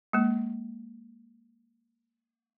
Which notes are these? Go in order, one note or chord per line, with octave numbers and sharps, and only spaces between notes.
G#3 A#3